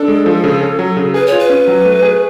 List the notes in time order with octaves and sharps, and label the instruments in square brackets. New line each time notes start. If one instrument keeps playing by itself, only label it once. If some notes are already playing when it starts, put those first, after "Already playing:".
Already playing: [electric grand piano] D4 [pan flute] A4
[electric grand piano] G#3
F3
C#3
C#4
F#3
C#3
[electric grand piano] G#4 [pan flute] B4
[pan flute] C#5
[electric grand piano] F4
[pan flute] B4
[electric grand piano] C#4
F#3
A3
G#4